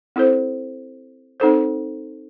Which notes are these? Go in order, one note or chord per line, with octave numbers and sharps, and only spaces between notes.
C4 E4 A4 C5
C4 D#4 A4 C5